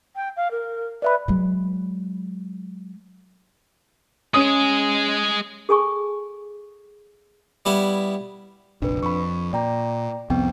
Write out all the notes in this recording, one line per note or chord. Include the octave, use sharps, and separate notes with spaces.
G5
F5
A#4
B4 D5 E5 B5
F#3 G#3
G#3 C#4 G#4 D#6
G#4 A4 G#5 A5 C#6
G3 B3 E4
F1 A#1 D4 B4
F2 B5 C#6
A#2 D5 G5 A#5
C2 F2 B3 C4 G5